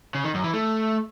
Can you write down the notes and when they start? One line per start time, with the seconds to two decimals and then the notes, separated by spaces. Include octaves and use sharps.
0.15 C#3
0.24 D#3
0.34 F#2
0.44 E3
0.53 A3